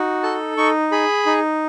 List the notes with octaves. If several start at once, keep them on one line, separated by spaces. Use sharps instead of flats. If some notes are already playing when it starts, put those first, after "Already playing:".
Already playing: D#4 F#4
A4 A5
D#4 C#6
G#4 B5
D#4